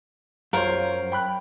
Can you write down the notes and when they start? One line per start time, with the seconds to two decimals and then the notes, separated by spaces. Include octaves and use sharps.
0.53 F#2 F4 A#4 C5 C#5
1.12 G5 B5 F#6